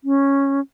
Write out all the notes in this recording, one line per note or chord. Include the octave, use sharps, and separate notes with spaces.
C#4